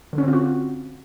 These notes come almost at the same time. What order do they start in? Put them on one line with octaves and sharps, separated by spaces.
D3 C#4 C4 F4 F#4